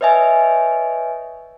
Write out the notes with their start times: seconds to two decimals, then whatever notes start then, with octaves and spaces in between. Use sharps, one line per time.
0.01 B4 C#5 D#5 E5 G#5